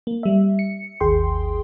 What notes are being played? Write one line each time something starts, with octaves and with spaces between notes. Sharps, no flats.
A#3
G3 E5
C#7
G#1 D#2 G#4 G5 C6